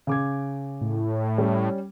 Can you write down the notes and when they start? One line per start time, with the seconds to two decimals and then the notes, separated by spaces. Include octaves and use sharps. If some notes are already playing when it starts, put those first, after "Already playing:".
0.07 C#3 D6 G#6
0.81 A2
1.38 G3 C#4